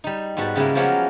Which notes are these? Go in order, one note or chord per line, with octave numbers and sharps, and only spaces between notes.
G3 D#4
G#2 G3 B3 F#4 A5
C#3 G3 G#3 A#3 E4
F3 F#3 G#3 A#3 B3 C#4